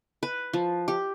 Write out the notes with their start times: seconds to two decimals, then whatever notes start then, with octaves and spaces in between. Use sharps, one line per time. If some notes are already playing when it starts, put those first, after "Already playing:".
0.23 B4
0.53 F3
0.88 G4